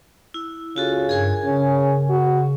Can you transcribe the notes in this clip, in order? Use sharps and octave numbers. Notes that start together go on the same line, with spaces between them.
E4
C#3 F4 F#4 A4
G2 G#4 A#4 G#5 G#6
C#3 C#4
F#4